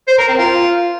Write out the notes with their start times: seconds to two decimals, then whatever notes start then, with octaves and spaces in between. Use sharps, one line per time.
0.07 C5
0.18 A#4
0.28 C4
0.39 F4